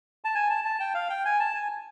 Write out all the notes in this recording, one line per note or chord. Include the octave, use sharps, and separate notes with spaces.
A5
G#5
A5
A5
G5
F5
G5
G#5
A5
G#5